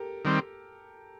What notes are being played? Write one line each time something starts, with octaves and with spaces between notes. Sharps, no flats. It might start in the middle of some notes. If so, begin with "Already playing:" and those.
Already playing: G4 A4 A#4
D#3 G3 C4